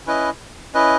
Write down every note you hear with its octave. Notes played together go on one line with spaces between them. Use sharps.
C#4 E4 B4 D#5
C#4 E4 B4 D#5